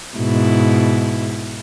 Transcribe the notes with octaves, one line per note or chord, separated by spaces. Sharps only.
G#2 B2 E4